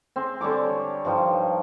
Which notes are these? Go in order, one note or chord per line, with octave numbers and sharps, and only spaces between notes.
C4 G#4
D3 G3 C#5 D6
G2 F3 D#4 G5